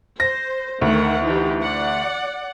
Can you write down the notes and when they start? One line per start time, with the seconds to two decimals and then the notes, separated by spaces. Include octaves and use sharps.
0.20 C5 A#6
0.82 D2 D#3 A3 F#5
1.25 E3 D#4 G4
1.61 D5 F#5